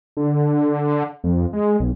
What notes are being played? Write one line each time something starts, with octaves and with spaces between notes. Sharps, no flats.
D3
F2
G#3
B1